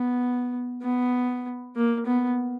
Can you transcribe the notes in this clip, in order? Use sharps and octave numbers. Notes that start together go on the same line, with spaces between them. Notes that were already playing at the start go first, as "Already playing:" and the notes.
Already playing: B3
B3
A#3
B3